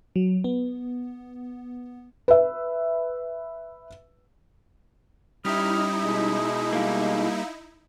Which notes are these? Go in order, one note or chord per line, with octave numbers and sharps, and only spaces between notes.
F#3
B3
B4 E5
G3 C#4 D#4 E4 G4 D#6 F6
B2 G#3
G3 A#3 F5